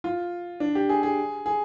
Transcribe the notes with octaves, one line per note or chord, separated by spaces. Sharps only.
F4
D4
G4
G#4
G#4
G#4